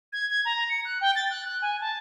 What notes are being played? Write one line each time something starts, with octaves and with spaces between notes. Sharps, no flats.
G#6
G#6
A#5
C#7
F#6
G5
A6
F#6
F#6
G#5
A5